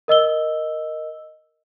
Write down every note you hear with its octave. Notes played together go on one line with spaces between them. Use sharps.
A#4 D#5 E6 G7